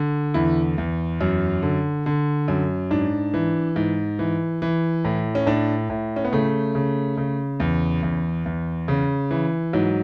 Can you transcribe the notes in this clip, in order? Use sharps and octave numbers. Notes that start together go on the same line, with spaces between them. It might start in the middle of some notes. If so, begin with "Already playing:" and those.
Already playing: D3
E2 E4
E2
F#2
D3
D3
F#2
G#2 D4
E3
G#2
E3
E3
A2
C#4
A2 D4
A2
C#4
B3
C#3 A3
C#3
C#3
E2
E2
E2
C#3
E3
G#2 F#3